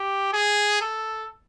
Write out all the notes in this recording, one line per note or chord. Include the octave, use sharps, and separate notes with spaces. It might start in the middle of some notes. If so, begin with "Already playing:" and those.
Already playing: G4
G#4
A4